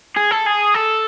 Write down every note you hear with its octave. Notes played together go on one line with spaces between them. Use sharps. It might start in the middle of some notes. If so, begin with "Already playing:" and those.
G#4
A4
G#4
A4